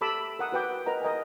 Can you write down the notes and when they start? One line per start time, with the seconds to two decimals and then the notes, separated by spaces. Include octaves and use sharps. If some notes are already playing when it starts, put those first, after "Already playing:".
0.01 G4 A4 A5 B5 D6 E6
0.39 A#4 F#5 D#6
0.52 F#4 B4 G5 D6
0.86 A#4 B4 D#5 F#5 A#5
1.02 A#4 D#5 G5 G#5